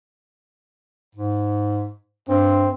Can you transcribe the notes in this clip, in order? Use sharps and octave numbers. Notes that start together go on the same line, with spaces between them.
G#2
G2 C4